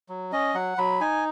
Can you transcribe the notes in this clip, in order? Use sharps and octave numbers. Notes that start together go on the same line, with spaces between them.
F#3
C#4 D#5
F#3 F#5
F#3 B5
D#4 G#5